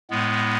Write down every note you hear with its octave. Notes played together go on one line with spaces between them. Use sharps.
A2 G#3 B3